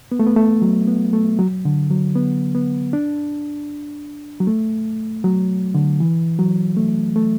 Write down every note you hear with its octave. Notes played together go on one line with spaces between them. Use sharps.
B3
A3
B3
A3
F#3
B3
A3
F#3
D3
F#3
B3
B3
D4
F#3
A3
F#3
D3
E3
F#3
A3
A3